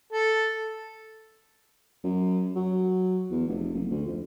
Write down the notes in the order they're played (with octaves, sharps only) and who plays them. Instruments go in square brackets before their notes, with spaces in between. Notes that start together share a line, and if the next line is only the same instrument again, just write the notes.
[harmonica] A4
[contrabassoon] F#2
F#3
E2
F1
F#1
D2
F2